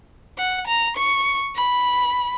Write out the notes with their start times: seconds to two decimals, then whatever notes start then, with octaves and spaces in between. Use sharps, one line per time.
0.38 F#5
0.67 A#5
0.97 C#6
1.56 B5